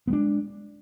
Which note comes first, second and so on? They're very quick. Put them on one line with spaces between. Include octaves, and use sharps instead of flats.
B3 G#3 D4